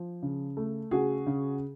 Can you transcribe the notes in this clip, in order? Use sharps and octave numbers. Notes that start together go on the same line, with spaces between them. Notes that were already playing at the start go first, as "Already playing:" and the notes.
Already playing: F3
C#3
A3
C#3 F#4 G#4
C#3